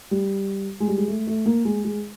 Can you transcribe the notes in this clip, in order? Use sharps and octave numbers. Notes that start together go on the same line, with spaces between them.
G3
G#3
G3
G#3
A3
A3
A#3
G#3
G#3